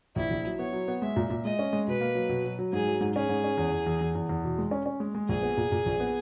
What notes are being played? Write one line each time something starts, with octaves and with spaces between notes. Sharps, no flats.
A#1 E4
A#1
F#3
B3 C#5
F#3
B3
G#3 E5
A#2
A#2
G#3 D#5
C#4
G#3
B2 B4
A#3
F#3
B2
F#3
F#3
G#2 G#4
F#3
G#2
C#4 G#4
G#2
C#4
E2
E2
E2
E2
E2
E2
B2
G#3
C#4
C#4
G#3
G#3
A#1 G#4
B3
A#2
A#2
A#1
B3